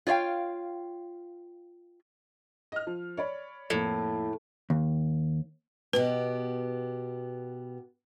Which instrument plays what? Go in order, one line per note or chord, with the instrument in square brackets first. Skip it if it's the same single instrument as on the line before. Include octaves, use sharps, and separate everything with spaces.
[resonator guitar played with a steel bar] F4 C#5 D5 F5 G5
[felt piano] D#5 F6
F3
C#5 D5 B5
[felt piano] F2 A#3 [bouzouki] A2
[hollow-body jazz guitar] D#2
[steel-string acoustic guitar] B2 B3 G4 [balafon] B4